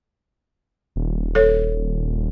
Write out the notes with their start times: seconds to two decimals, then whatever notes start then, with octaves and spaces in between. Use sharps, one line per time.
0.96 D#1
1.35 A4 C#5